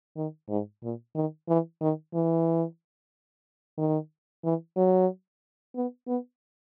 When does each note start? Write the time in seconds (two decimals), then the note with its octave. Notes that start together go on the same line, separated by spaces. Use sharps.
0.16 D#3
0.49 G#2
0.82 A#2
1.15 D#3
1.48 E3
1.81 D#3
2.14 E3
3.77 D#3
4.44 E3
4.76 F#3
5.75 B3
6.07 B3